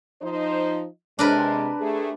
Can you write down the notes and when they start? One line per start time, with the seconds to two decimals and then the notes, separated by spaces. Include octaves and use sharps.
0.22 F3 D#4 C5
1.19 C3 G#3 D4 A#4 B4
1.80 A3 G4 G#4